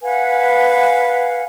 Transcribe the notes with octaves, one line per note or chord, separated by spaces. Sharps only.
B4 F5 F#5 G#5